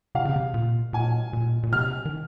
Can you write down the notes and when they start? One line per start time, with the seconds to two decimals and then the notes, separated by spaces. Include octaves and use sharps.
0.15 C3 F5
0.25 C#3
0.36 C3
0.54 A#2
0.93 A#2 G#5
1.33 A#2
1.63 A#2
1.72 C3 F6
2.05 D#3